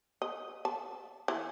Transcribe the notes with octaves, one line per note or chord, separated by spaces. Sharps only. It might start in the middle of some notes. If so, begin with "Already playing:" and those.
D#5
A5
E3